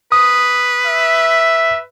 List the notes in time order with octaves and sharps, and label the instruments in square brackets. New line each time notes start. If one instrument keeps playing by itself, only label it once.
[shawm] B4 [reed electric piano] D#6
[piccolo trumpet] E5